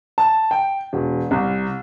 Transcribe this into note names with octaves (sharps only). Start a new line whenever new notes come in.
A5
G5
E1
C2